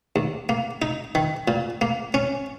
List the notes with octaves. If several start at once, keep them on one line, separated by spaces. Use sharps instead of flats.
D#2
A#3
D#4
D#3
A#2
A#3
C#4